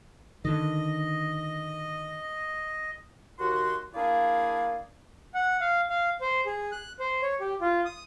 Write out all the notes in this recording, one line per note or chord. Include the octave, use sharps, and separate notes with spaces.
D3 D#3 D#5
D#2 F#4 C6
A#3 D4 E4 G#4 D5 F5
F#5
F5
F5
C5
G#4
F#6
C5
C#5
G4
F4
D#6